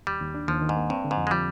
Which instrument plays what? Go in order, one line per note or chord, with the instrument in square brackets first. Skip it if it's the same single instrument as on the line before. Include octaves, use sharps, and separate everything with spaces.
[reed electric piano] D#2 [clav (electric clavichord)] G3
[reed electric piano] D#2
D4
[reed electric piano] D#2 [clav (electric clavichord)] F3
[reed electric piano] D#3
[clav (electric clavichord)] G#2
[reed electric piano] A#3
[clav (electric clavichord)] G2 [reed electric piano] C4
[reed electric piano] D3
[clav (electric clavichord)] G#2
[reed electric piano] F2
[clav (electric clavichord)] G#3
[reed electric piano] F3 [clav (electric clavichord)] G3